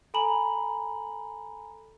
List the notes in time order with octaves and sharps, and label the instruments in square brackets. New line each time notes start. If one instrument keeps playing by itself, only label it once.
[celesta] A4 G#5 A#5 B5 F#7